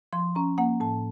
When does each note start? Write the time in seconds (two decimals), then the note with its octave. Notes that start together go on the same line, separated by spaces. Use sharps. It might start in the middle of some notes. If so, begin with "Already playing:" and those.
0.13 F3 C6
0.35 C#4 A#5
0.58 A#3 F#5
0.80 A2 A5